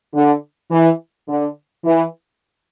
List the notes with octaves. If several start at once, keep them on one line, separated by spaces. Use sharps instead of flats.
D3
E3
D3
E3